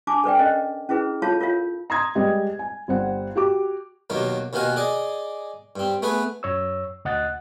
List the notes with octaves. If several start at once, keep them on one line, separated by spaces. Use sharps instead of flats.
D4 G#5 A5 D6
A4 B4 D5 G5
C#4 A#4 D#5
C#4 E4 G#4 B4
F4 A4 C#5 F5 A5
F4 A#4 C#5 F5
A#5 C6 D#6 G#6
G3 G#3 G4 B4 D#5
G#5
G1 G3 C5 F#5
F#4 G4 D6
D#2 B2 F#3 A#3
D#2 B2 D#3 F5 F#5 G#5
G#4 D5 D#5
G2 C4
A3 B3 G#4 B4
F#2 C#5 E6
D2 D#5 F#5 F#6 A6